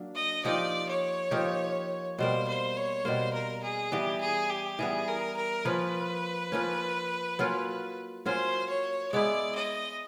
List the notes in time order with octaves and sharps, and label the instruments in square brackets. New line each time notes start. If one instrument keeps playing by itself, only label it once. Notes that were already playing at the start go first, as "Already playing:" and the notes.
Already playing: [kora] F#3 A#3 D4
[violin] D#5
[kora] F3 A#3 D#4 G4 [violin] D5
[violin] C#5
[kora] F3 A#3 D#4 G4
[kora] B2 G3 A#3 [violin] C5
[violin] C5
C#5
[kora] B2 G3 A#3 [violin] C5
[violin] A#4
G#4
[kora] E3 G3 B3 [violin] G4
[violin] G#4
G4
[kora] E3 G3 B3 [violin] G#4
[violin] A#4
A#4
[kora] F3 A#3 C#4 [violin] B4
[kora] F3 A#3 C#4
F#3 A#3 C#4 F4
[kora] F#3 A#3 C#4 F4 [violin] C5
[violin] C#5
[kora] G#3 B3 E4 [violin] D5
[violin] D#5